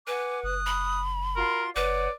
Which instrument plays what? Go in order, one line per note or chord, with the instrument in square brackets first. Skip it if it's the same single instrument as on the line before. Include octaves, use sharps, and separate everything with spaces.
[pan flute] B4 [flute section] F#5 G#5 D6
[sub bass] F#1 [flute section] D#6 F#6
[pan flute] B5
[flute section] F4 F#4 C6 [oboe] A#4
[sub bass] F#1 [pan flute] B4 [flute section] C#5 F#5 [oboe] D5